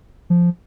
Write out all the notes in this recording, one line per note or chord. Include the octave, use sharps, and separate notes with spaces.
F3